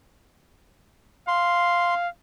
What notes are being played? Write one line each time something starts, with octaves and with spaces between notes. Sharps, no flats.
F5 C6